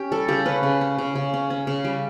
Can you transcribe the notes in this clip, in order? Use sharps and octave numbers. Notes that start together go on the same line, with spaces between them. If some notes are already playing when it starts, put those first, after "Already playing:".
Already playing: C#4 G4
G3 A4
C#3 G4
C#4 B4
C#3
C#4
C#3
C#3
C#4
C#4
C#3
G3